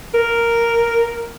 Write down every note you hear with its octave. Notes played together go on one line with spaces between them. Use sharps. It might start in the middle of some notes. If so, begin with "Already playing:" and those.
A#4